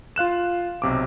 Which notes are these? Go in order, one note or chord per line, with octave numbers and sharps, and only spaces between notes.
F4 F5 F#6 E7
B1 C3 D6